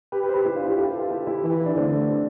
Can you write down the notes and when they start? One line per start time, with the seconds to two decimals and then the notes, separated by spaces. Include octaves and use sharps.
0.12 G4 B4
0.23 G4 B4
0.29 C5
0.34 G4 B4
0.45 E4 G4
0.56 D4 F4
0.66 E4 G4
0.78 F4 A4
0.88 G4 B4
1.00 F4 A4
1.10 E4 G4
1.27 E4 G4
1.43 E3
1.65 D4
1.76 D3 A3 C4